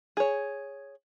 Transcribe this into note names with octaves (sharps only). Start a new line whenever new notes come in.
G#4 C#5